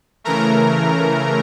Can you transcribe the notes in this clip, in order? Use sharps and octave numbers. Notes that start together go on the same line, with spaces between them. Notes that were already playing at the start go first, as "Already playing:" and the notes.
C#3 E3 A3 A#4 A#5